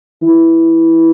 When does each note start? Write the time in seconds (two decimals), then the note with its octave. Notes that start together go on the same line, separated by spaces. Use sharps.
0.22 E3